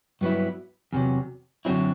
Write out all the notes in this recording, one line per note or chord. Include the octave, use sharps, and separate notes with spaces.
G2 F#3 B3 E4
E2 C3 F#3
F#2 D3 F#3 C4 E4